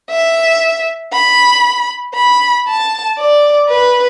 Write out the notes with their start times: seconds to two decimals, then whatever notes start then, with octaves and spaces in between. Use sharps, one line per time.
0.10 E5
1.13 B5
2.15 B5
2.67 A5
3.18 D5
3.69 B4